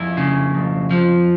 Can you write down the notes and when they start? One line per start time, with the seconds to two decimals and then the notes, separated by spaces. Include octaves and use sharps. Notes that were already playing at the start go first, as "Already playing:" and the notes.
Already playing: F2 E4
0.17 C#3
0.54 F2
0.91 F3